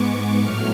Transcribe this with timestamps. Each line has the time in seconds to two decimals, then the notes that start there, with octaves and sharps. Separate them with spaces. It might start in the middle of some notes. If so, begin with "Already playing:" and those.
Already playing: G#2 G#3 B3 C#6 D6
0.39 A2 F#3 A3 F6